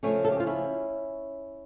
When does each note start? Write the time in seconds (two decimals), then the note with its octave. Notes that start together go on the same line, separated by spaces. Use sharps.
0.03 C#3 F3 A3 C#4
0.24 A4
0.31 G4
0.40 F4
0.46 C#4 E4